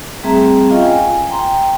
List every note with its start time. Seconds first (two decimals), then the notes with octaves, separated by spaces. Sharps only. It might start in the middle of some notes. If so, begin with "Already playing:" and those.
0.23 G3 A3 C4 G#4 E5 A#5
0.70 C#4 F4 D#5 F5 G5
0.84 G#5
1.29 G5 A#5 C6